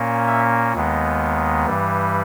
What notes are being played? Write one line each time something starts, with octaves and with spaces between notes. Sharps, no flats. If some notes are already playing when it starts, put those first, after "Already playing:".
Already playing: A#2 A#3 C#4
E5
D#2 D#3 G#3 B3
G2 E3 G3